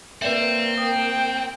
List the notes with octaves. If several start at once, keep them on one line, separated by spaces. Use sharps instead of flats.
A#3 C4 B4 D5 E5
G5 D#6